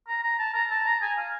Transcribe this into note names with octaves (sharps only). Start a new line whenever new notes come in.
A#5
A#5
A5
A#5
A5
A#5
G#5
F5